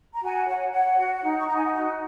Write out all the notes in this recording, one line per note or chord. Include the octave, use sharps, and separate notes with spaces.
A#5
F#4 G#5
C#5 F#5
C#5 F#5
F#4
D#4
C#6
D#4 A#5
G#5
F#5
F#4 D#5